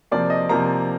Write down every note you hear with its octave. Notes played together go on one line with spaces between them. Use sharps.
C3 F3 A#3 D5
D#5
C3 F3 A#3 A#5